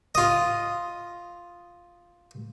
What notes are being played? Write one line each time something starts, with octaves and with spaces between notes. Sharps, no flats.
F4 D#5